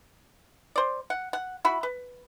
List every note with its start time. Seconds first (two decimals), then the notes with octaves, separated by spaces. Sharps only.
0.76 C5 D5
1.10 F#5
1.33 F#5
1.65 E4 F#4 B5
1.83 B4